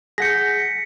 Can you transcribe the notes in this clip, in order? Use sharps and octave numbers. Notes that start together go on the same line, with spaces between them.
G#4 F#5 G6 A#6 B6 C#7